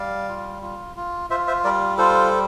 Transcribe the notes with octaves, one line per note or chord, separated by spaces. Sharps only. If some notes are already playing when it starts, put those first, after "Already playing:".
Already playing: G3 D5 F5
F4
F4
F4
F4 C5 E5
C5 E5
G3 A#4 D5
F4 A4 C5